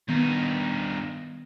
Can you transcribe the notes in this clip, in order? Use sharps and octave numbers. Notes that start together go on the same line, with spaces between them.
G2 D#3 B3 D#4